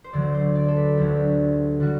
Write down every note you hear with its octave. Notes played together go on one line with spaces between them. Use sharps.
C5
D2 D3 F#3 D5
C5
D5
A4
B4
D2 D3 F#3 G4
D3 G3 F#4